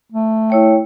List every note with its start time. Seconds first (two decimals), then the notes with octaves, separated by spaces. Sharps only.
0.12 A3
0.50 E4 C#5 G5